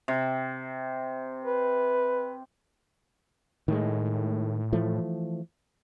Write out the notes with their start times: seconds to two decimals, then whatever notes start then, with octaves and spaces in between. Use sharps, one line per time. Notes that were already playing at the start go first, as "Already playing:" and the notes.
0.08 C3
1.45 B4
3.68 A2 D#3 G#3
4.72 E3 F3 A3